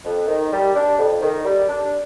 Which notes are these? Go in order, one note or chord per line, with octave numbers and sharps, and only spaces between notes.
F2
D#3
G3
D4
F2
D#3
G3
D4